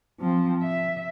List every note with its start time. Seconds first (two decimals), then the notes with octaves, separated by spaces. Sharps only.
0.20 F3 C4
0.62 E5